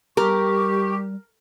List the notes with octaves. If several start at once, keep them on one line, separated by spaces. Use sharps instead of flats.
G3 G4 A#4 C#6